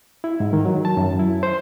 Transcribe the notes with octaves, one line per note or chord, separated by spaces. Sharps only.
E4
G#2
D#3
F#3
A5
F#2
E4
C5